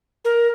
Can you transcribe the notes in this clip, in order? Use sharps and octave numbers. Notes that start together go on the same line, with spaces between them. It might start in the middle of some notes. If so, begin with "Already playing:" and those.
A#4